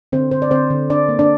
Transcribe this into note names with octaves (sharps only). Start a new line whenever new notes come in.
D3 C4 C5
D3 C5
D5
D3 C4 C5
D3
D3 D4 D5
A#3
D4 D5